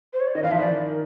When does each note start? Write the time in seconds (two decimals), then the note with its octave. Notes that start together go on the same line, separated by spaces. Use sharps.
0.13 C5
0.20 C#5
0.28 D5
0.35 D#3 D#5
0.43 E3 F5
0.51 F3 E5
0.59 E3 D5
0.67 D#3
0.89 A#4